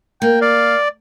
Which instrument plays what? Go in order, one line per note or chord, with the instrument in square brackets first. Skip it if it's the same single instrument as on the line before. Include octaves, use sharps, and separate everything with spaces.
[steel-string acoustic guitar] A#3 [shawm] G5
[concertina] D5 [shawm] F5